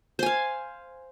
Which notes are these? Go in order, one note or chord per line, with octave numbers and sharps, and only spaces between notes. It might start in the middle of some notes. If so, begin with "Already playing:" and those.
C5 F5 G#5